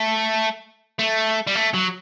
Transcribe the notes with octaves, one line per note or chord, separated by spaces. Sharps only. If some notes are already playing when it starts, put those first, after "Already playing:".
Already playing: A3
A3
G3
A3
F#3